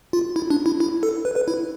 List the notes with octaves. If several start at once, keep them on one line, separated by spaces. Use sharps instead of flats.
F4
E4
D4
E4
E4
A4
B4
B4
E4